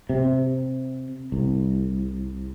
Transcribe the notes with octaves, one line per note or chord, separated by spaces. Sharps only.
C3
C2